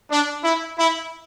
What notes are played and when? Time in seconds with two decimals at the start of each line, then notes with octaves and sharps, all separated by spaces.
0.10 D4
0.43 E4
0.77 E4